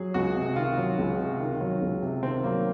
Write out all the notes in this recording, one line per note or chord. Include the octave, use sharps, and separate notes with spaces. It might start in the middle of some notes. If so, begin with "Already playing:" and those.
Already playing: F#3 G#4
C#2 F#4
C3
D#3 F4
F#3
C#2
C3
D#3
F#3
C#2
C3
D#3 C4
F#3 A#3